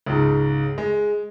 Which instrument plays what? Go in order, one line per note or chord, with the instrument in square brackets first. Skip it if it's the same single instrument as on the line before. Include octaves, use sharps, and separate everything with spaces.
[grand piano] C#2 G#2
G#3